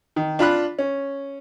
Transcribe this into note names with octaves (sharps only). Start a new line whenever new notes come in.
D#3
D4 F4 B5 F#6
C#4